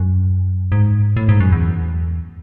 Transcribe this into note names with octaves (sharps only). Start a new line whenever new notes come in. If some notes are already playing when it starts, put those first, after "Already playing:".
Already playing: F#2
G#2
A2
G#2
F#2
E2